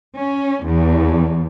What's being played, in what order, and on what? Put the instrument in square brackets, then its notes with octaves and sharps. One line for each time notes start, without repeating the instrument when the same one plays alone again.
[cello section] C#4
E2